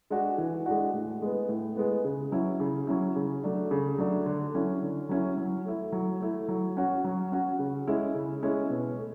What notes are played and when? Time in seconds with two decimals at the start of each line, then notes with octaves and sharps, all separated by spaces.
0.10 G#3 D4 F#4
0.38 E3
0.66 G#3 D4 F#4
0.94 A2
1.22 G#3 B3
1.49 A2
1.76 G#3 B3
2.05 C#3
2.32 F#3 C#4 E4
2.60 C#3
2.87 F#3 C#4 E4
3.16 C#3
3.43 F#3 A3 D4
3.71 C#3
3.98 F#3 A3 D4
4.26 D3
4.54 F#3 C#4 E4
4.82 D3
5.09 F#3 C#4 E4
5.37 F#3
5.65 A3 E4
5.92 F#3
6.21 A3 E4
6.48 F#3
6.77 C#4 F#4
7.04 F#3
7.32 C#4 F#4
7.59 C#3
7.87 G#3 C#4 E4
8.15 C#3
8.43 G#3 C#4 E4
8.70 B2
8.98 A3